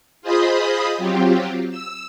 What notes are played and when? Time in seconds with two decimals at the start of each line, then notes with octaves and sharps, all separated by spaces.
0.22 F4 G#4 C5 D#5 B5 D#6
0.98 F#3 C4 F4 G4
1.70 E6